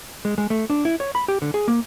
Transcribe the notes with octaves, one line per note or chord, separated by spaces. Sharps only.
G#3
G#3
A3
D4
E4
C#5
B5
G4
D3
G#4
A#3